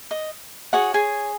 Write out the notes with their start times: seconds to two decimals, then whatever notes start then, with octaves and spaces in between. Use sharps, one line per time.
0.11 D#5
0.73 F#4 G#4 C#5 F#5
0.94 G#4 G#5